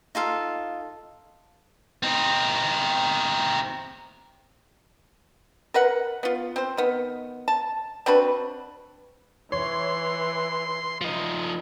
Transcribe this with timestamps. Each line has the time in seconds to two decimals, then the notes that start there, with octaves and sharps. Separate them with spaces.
0.15 D#4 F4 A4 F5
2.03 C4 D#4
5.74 A#4 B4 F#5
6.23 B3 F4
6.56 C4 C5
6.77 D#3 B3
7.48 A5
8.06 C4 D4 F#4 B4
9.52 E3 C#5 C6
11.01 F3 D#4